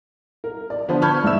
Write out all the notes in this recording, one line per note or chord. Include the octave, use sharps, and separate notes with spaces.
A#4
D5
D3 F3 B3 B4 C5
A5 B5 C#6 F6 G6 G#6
E1 G#2 D5 E5 E6 E7